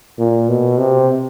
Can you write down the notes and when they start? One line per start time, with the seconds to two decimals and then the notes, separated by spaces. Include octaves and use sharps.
0.19 A#2
0.49 B2
0.78 C3